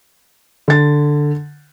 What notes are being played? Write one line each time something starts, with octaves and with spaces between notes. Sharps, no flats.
D3 A6